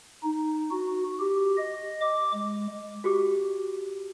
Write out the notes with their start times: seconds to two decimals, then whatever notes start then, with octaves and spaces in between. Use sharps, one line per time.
0.24 D#4
0.71 F#4
1.20 G4
1.57 D#5
2.01 D6
2.33 G#3
3.04 F#4 G4 D6